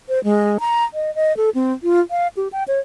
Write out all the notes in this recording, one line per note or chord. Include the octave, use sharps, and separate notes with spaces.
C5
G#3
A#5
D#5
D#5
A4
C4
F4
F5
G4
G5
C#5